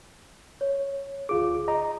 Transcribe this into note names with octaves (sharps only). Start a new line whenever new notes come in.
C#5
D2 F4 G#4 D6
D#5 A#5